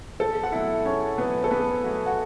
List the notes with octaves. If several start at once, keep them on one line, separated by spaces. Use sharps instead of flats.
E2 A4 A5
F#5
B2 F#3 A3 E4 E5
E2 C#4 C#5
B2 F#3 A3 B3 B4
A4
E2 B3 B4
B2 F#3 A3 F#4
F#4